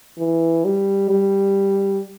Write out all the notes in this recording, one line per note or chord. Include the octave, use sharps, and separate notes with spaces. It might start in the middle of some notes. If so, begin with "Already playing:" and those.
E3
G3
G3